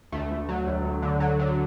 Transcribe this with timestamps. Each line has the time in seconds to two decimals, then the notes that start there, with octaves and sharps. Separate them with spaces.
0.12 D2 A3
0.31 D2
0.49 F#3
0.66 D2
0.85 D2
1.02 D3
1.20 F#3
1.39 D3